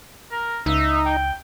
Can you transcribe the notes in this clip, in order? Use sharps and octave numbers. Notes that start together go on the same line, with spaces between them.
A#4
C#2 D#4 E5
G5